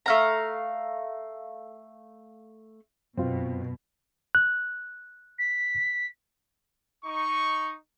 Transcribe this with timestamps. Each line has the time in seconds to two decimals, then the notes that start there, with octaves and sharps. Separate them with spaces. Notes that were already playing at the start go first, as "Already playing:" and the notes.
0.06 A3 F5 A#5
3.18 F#2 B2 C4 F4
4.35 F#6
5.39 B6
7.05 D#4 C#6